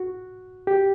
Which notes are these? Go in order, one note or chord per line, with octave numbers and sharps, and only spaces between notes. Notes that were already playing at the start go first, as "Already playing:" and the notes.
Already playing: F#4
G4